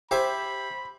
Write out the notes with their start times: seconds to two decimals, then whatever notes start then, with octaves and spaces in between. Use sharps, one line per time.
0.11 G4 C5 E5 G#5 B5